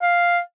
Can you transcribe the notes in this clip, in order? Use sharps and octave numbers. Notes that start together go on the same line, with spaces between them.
F5